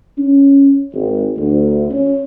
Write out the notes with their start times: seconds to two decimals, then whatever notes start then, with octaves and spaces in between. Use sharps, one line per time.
0.18 C#4
0.94 G#1
1.36 D2
1.91 C#4